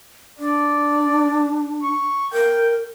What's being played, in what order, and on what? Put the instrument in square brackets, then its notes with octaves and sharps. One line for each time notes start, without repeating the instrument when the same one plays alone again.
[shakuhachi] D4 [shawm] D5
[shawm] C#6
[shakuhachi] A#4 [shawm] G5